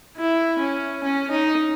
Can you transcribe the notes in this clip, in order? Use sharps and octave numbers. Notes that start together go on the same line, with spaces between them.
E4
C#4
C#4
D#4